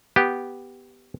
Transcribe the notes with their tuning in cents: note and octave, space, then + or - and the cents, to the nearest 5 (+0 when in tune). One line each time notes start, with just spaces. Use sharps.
B3 +0 G4 +0